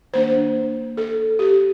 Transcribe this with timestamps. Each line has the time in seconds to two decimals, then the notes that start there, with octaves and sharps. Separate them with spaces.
0.13 D#3 A#3 D4 C5
0.97 A4
1.39 G4